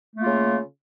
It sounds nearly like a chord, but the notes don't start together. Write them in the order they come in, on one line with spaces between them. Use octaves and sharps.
A3 A#3 F4 C#3